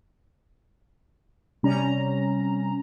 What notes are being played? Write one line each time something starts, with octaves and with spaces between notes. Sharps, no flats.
C3 G3 C#4 A#5